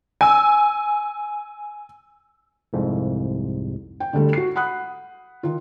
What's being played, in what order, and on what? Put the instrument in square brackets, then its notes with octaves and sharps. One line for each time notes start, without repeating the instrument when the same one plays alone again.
[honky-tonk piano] G#5 E6
[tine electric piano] C2 F2 G#2
[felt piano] G5
D2 D3 G3 A3
F#4 C7
F#5 B5 D#6 F#6
D#3 F4